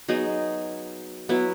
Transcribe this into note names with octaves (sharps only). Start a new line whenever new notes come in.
F#3 B3 D#4 G#4
F#3 B3 E4